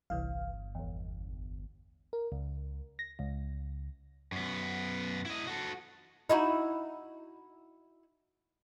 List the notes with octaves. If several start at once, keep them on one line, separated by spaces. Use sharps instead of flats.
G1 C2 E3 F5
A#1 E2
A#4
C#2
A#6
C#2
F#2 B3
E4 D#5
F#4 A4
D#4 E4 F#4